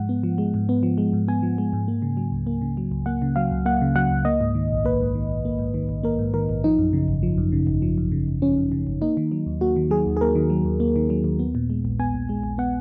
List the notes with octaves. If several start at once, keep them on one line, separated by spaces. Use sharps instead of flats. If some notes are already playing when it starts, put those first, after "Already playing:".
Already playing: G#2 F3 G#3 F#5
B3
F3
G#3
G#2
B3
F3
G#3
G#2
B3 G#5
F3
G#3
G#2
A#3
C#3
F#3
C#2
A#3
C#3
F#3
C#2
A#3 F#5
C#3
F#3 F5
C#2
A#3 F#5
C#3
F#3 F#5
C#2
A#3 D#5
G#2
D#3
A#1
A#3 B4
G#2
D#3
A#1
A#3
G#2
D#3
A#1
A#3 A#4
G#2
D#3 A#4
A#1
F3 D#4
F#2
C#3
G#1
F3
F#2
C#3
G#1
F3
F#2
C#3
G#1
F3 C#4
F#2
C#3
G#1
A#3 D#4
D#3
F#3
D#2
A#3 F#4
D#3
F#3 G#4
D#2
G#4
A#3 A#4
D#3
F#3
D#2
A#3
D#3
F#3
D#2
B3
A#2
G#3
A#1
B3 G#5
A#2
G#3
A#1
B3 F#5